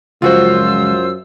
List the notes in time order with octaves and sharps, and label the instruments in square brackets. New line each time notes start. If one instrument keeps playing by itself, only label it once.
[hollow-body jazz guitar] C#2 F3 F#4 [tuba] F#2 [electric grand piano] F4 C5 [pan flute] E6